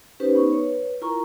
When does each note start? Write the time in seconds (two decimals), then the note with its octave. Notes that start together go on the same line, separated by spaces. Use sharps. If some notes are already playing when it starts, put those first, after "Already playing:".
0.20 C#4 D#4 G4 B4 C5
0.35 B3 D#4 C#6
0.48 B4 C#5
1.01 E4 F4 A#4 A#5 C#6